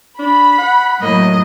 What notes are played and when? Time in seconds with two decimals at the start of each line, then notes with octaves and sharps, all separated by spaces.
0.19 D4 B5
0.58 F#5
1.02 A2 F#3 A#3 D#5